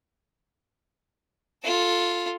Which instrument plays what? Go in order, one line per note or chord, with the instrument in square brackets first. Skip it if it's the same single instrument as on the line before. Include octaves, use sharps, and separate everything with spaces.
[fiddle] F4 A4